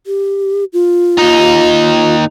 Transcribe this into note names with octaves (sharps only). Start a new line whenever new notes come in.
G4
F4
D#2 D#4